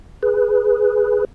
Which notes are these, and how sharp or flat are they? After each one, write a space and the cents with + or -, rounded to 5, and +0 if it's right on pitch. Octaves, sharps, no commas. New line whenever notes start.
G#4 +5 B4 +0